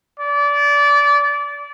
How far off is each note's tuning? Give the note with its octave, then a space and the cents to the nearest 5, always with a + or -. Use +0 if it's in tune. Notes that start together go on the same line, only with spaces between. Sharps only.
D5 -25